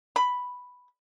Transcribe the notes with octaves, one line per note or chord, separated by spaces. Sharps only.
B5